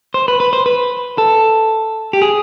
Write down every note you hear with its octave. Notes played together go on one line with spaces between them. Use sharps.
C5
B4
B4
C5
B4
A4
G4
G#4